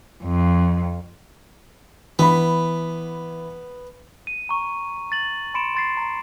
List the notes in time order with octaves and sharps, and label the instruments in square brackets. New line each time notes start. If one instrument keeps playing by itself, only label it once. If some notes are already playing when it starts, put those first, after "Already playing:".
[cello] F2
[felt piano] E3 B5 [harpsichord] B3
[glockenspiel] D#7
A#5 C#6
A6 F#7
B5 C6 C#7 D7 E7
C6 A6 C7
A#5 A6